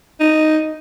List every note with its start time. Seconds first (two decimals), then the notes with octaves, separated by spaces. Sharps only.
0.20 D#4